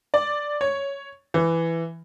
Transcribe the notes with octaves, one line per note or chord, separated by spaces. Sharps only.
D5
C#5
E3